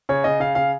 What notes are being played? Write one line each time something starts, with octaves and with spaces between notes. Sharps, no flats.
C#3 C#5
C#3 D#5
C#3 F5
C#3 F5